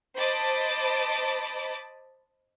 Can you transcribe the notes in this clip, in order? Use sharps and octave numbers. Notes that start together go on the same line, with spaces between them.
C5 D#5 A5 B5 D6